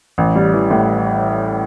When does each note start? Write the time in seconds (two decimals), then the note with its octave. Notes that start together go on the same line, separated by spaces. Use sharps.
0.18 A1
0.35 G3
0.53 E3
0.71 A2